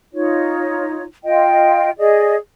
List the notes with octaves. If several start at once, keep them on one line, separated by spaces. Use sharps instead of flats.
D#4 F4 C#5
F4 D#5 G5
G#4 D5 D#5